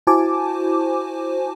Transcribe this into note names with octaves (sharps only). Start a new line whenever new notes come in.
E4 F#4 C5 G#5 A5 D6